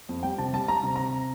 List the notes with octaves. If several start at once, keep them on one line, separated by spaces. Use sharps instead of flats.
F2
G3 G5
C3 A5
G3 A5
G3 A#5
C3
C3 A#5